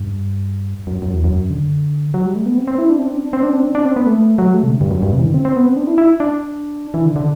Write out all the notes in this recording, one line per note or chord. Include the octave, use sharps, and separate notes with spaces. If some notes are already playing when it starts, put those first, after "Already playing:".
Already playing: G2
F#2
F#2
E2
F#2
D3
F#3
G3
A3
B3
C4
C4
E4
D4
C4
D4
C4
D4
C4
D4
D4
C4
B3
A3
F#3
A3
C3
D3
G2
F#2
G2
C3
E3
D3
C4
C4
B3
C4
D4
E4
E4
D4
E3
D3
D3